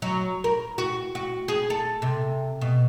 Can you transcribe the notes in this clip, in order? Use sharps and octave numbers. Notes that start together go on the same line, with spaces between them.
F#3
A#4
F#4
F#4
G#4
A4
C3
B2